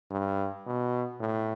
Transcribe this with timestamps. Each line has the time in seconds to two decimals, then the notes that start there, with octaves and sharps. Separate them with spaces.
0.11 G2
0.66 B2
1.20 A2